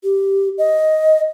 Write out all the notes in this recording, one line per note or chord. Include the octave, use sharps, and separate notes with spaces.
G4
D#5